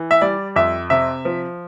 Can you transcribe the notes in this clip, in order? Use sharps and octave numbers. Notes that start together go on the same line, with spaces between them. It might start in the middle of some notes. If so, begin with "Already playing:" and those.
Already playing: E3
E5
G3 D5
F2 E5
C3 E5
F3